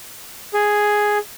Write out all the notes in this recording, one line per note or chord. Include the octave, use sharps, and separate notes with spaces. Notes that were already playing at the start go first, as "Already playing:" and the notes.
G#4